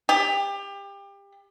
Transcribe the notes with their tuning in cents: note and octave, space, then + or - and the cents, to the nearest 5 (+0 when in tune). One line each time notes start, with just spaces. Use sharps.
G4 +25